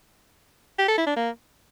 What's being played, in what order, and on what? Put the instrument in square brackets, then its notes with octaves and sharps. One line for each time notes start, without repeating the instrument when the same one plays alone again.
[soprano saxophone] G4
A4
E4
D4
A#3